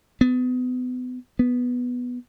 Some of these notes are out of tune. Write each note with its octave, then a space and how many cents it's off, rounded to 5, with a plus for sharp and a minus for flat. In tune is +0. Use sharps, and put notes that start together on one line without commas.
B3 +30
B3 +0